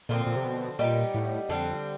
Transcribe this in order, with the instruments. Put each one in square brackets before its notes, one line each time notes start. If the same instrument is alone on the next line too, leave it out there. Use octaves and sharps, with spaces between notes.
[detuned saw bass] A#2 [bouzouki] D3 F3 A3 C4
[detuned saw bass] A#2
C3
B2
[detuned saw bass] A#2 [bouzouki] G3 B3 D#4 G4
[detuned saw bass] A2
[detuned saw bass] F2 [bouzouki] D3 G3 C4